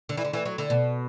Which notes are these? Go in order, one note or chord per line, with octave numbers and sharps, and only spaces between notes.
D3
E3
D3
E3
F#3
D3
B2